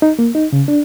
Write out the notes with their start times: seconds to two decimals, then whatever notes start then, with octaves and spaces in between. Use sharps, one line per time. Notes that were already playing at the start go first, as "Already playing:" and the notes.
0.02 D#4
0.19 A#3
0.35 D#4
0.53 C#3
0.68 D4